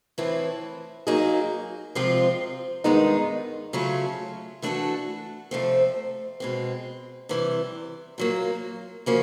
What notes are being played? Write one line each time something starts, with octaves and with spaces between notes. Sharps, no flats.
A2 E3 A3 C4 E4
F#3 A#3 D#4 G#4
C3 F3 G#3 C4 F4
G2 D#3 G#3 B3 D#4
C#3 F#3 A3 C#4 F4
E3 A3 D4 F#4 A4
F2 C3 F3 A3 C4
B2 G#3 C4
C3 E3 G3
A#2 F#3 A#3
C#3 F3 A#3 C#4 F#4